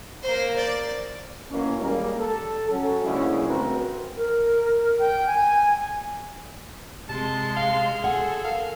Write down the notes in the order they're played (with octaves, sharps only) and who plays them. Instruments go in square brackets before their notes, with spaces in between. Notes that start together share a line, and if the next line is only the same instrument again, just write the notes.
[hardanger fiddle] A#3 C5
D5
[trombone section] B2 E3 A#3 C#4
D#3 G3 G#3 A#3
A4
F#3 C#4
D2 A#2 C#3 G#3 C#4 E4
G2 A3 C4 F#4 A#4 B4
[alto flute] A#4
G5
G#5
[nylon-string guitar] C3 [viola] G#3 C6 [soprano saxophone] A5
[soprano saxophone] F5
[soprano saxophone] G#4 [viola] A4 [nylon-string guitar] F#5
[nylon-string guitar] A#4 [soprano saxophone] F5